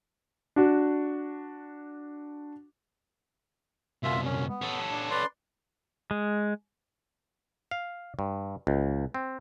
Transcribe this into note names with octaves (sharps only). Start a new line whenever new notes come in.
D4 F#4
C2 F#2 F4 E5
C#4
B3
C#4 A4
D4
B4 D5 C6
G#3
F5
G2
C#2
C4